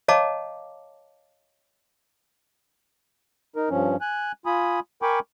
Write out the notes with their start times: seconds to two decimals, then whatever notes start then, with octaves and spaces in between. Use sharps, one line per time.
0.08 C#5 D#5 F5 A5 A#5 D6
3.56 D#4 A#4
3.70 G2 F3 C#4
4.01 G#5 F#6
4.46 F4 G#5 B5 D#6
5.02 A#4 G5 G#5 B5 C#6 D6